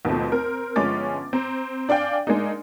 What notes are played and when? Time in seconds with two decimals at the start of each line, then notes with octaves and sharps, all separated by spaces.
0.05 D#2 B2 F3 A3 C4
0.32 C4 A#4
0.76 G1 F3 G#3 C#4 D6 A6
1.33 C4 A#5
1.89 D4 D5 F5 G5 G#5
2.27 G#3 A#3 D4 D#4